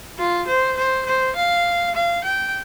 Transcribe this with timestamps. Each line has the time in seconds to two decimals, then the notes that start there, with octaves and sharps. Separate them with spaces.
0.18 F4
0.48 C5
0.77 C5
1.06 C5
1.36 F5
1.95 F5
2.24 G5